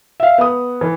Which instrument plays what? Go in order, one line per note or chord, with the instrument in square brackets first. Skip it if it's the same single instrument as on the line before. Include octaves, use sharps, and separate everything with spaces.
[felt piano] E5 F5
B3 D#6
E3